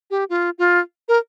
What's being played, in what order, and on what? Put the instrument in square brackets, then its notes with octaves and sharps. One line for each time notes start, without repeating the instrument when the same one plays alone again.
[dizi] G4
F4
F4
A#4